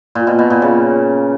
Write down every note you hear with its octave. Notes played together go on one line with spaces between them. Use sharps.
A#2
B2
B2
A#2
C#3